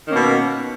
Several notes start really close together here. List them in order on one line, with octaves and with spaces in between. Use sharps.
D#3 C#4 A#3 B2